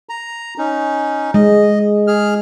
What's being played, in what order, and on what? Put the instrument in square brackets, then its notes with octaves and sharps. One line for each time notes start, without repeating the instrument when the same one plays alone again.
[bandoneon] A#5
C#4 D#4
[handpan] G#3 [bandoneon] D#5
[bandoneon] G#4 F6